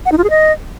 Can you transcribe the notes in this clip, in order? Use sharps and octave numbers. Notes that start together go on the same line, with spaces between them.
F#5
D#4
F4
G#4
D#5